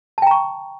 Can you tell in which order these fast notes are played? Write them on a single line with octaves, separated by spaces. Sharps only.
A5 G5 A#5 C#6